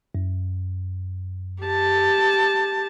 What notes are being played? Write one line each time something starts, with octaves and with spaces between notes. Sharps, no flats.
F#2
G4 A5